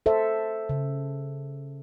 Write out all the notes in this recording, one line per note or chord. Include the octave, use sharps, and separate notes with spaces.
A4 C5 E5
C#3